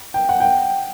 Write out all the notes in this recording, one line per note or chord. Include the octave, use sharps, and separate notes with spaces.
G5
F#5
G5